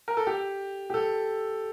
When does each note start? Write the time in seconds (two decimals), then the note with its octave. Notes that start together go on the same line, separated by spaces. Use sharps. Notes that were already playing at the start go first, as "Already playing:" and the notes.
0.08 A#4
0.17 A4
0.27 G4
0.90 G4
0.94 A4